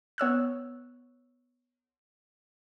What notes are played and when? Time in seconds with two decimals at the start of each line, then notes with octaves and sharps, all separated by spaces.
0.18 B3 C#5 E6 F#6